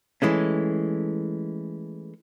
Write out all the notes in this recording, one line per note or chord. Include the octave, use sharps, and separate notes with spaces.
E3 G#3 A3 C#4